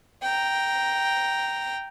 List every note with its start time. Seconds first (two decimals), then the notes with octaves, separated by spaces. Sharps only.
0.23 G5 A#5